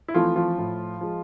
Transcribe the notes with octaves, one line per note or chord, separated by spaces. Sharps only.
E4
E3 F3 A3 C4 F4
F3 F4
A2
F3 G#3